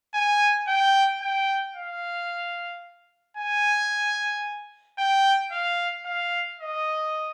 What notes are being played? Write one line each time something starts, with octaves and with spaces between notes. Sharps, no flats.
G#5
G5
G5
F5
G#5
G5
F5
F5
D#5